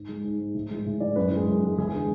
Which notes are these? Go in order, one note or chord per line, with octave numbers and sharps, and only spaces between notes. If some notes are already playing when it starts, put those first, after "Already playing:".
Already playing: G#2
G#3
G#2
G#3
A2
E3 G#3
A2
E3 G#3 D5
F#2 B4
E3 G#3
F#2
E3 G#3
E2 G#4
G#4
D3 G#3